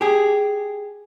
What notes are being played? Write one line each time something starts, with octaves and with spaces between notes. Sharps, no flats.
G4 G#4